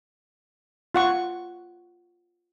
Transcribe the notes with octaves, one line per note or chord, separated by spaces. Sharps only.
F4 F#5 C#6